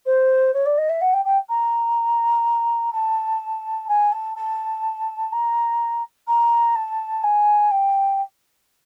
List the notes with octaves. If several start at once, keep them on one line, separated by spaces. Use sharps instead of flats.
C5
C#5
D5
D#5
E5
F#5
G5
G5
A#5
A5
G#5
A5
A5
A#5
A#5
A5
G#5
G5